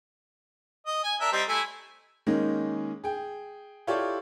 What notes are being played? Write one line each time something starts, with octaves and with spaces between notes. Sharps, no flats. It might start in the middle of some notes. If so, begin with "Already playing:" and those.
D#5
G#5
D4 A#4 E5
G3 C4 D#4
A3 E4 G#5
D#3 G#3 A#3 C#4 D#4
G#4 G5
E4 F4 G4 A4 C#5 D5